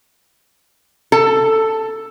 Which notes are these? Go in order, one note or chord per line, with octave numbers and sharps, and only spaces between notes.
A4